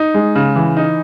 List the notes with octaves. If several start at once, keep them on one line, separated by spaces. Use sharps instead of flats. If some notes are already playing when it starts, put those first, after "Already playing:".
Already playing: D#4
G#3
C#3
E3
D#4